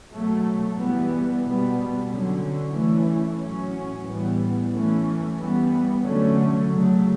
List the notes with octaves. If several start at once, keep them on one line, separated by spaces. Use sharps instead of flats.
B2 F#3 A3
E3 G3 B3
B2 G3 B3
D3 F#3 C#4
E3 A3 C#4
A2 F#3 C#4
A2 E3 G3 B3
E3 A3 C#4
E3 G3 B3
D3 F#3 A3 C#4
C#3 F#3 A3